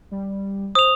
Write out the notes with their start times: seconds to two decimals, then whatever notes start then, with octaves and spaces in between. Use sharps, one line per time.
0.11 G3
0.75 C5 D#6 F7